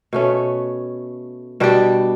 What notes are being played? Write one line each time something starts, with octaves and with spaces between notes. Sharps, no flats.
B2 A3 C#4
B2 G3 D4 G4